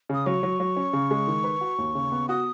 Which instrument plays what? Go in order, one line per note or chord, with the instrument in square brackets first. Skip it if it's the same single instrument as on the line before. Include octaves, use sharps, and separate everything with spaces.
[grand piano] C#3 [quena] D#6
[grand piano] F#3 [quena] C#6
[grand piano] F#3
F#3
C#4
C#3
G#3
D#3
B4
F#4
D#2
C#3
B3
[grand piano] F#4 [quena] D#6